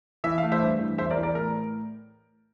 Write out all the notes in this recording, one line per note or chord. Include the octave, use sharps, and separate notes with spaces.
E3 E5
F5
A3
C5 E5
G2
E3
E2 C5 E5
A#4 D5
E3
A#4 D5
A2 A#4